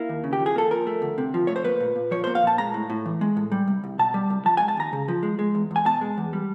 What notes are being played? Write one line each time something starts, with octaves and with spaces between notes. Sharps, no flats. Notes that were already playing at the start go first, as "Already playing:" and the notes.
Already playing: A#3 E4
D#2
C#3
G4
F3
G#4
A#3 A4
F3 A#4
A3
D2
C3
F3
A3 C#5
C5
A#3 B4
A#2
A#2
F3 C#5
A#3 C5
F5
A#2 A5
G#3 A#5
A2
A2
E3
G#3
A2
G3
C2
C2
B2 A5
G3
C2
F3 A5
G#3 G#5
A5
D#2 A#5
C#3
F3
G#3
G#3
E2
E2
G#5
B2 A5
G#3
E2
G3